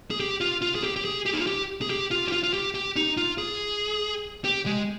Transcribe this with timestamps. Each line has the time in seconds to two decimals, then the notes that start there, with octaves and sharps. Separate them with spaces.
0.11 G#4
0.20 G4
0.41 F4
0.62 F4
0.75 G#4
0.84 G4
0.96 G4
1.05 G#4
1.26 G4
1.33 D#4
1.39 F4
1.47 G4
1.82 G#4
1.90 G4
2.11 F4
2.28 G4
2.32 F4
2.43 F4
2.53 G4
2.75 G4
2.96 D#4
3.17 F4
3.38 G#4
4.45 G4
4.66 G#3